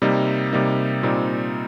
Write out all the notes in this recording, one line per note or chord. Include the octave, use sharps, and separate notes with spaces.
C3 G3 A#3 D#4
C3 G3 A#3 D#4
A#2 G3 C4 D#4